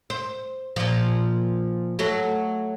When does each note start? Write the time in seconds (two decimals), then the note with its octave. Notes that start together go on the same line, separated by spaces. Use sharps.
0.10 C5
0.76 A#2 F3
1.99 F#3 A3 F#4